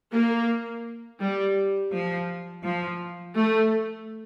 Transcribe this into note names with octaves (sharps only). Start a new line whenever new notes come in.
A#3
G3
F3
F3
A3